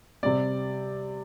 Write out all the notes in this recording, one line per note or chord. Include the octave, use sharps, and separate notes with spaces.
C3 G3 C4 D5